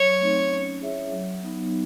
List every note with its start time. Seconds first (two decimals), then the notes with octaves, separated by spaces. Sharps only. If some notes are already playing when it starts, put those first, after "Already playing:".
Already playing: F#3 C#5
0.21 A3 C4 D#4
0.50 C#4
0.81 E4 G#4 C#5 E5
1.12 F#3
1.42 B3 D#4